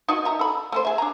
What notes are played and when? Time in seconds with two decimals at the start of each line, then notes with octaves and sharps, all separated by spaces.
0.08 D#4 F#4 D#5
0.25 E5 A#5
0.39 A4 B5
0.72 A3 A4 C5
0.85 G#4 E5
0.98 D4 A#5